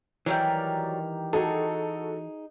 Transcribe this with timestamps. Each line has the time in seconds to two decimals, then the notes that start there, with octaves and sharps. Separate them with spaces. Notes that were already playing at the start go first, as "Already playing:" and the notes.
0.26 D#3 E3 F#3 G3 A#4 D5
1.33 D#4 F#4 G#4 A4